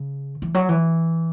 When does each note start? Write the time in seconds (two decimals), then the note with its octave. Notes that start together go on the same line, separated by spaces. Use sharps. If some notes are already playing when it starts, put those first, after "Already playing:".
Already playing: C#3
0.42 E3
0.54 F#3
0.69 E3